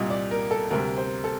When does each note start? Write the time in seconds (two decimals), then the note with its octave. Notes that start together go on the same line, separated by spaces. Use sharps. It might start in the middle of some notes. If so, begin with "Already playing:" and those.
Already playing: C2 A#2 G3 D#5
0.10 D5
0.31 A#4
0.51 A4
0.71 D2 C3 G3 A#4
0.98 C5
1.24 A4